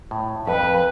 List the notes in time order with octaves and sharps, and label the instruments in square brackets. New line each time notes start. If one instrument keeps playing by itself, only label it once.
[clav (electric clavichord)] A2
[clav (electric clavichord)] F2 [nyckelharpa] B4